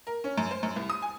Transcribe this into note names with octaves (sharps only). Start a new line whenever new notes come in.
A#4
C#4
F#2
C5
F#2
C2
D#6
G#5